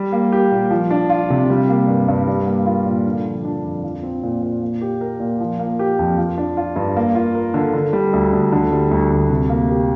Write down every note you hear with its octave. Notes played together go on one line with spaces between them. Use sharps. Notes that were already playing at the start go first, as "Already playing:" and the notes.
Already playing: G3
A#3
G4
A#2
F3
D4
F4
C3
G3
A#3
G2
G2
G3
A#3
F4
A#2
D3
F3
D4
F2
F3
C4
A#2
A#2
A#3
G4
A#4
A#2
F3
A#3
G4
F2
F3
D4
F4
G2
A#3
F4
A#4
D3
D3
G3
D2
D2
D3
G3
D2
D2
C3
A#3
G4